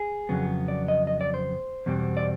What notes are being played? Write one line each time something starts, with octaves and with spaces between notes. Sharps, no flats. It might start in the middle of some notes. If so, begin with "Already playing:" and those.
Already playing: G#4
F2 C#3 F#3 B3
D5
D#5
D#5
D5
C5
E2 B2 G3 C4
D5